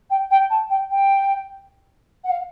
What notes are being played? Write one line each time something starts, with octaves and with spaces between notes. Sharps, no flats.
G5
G5
A5
G5
G5
F#5
F5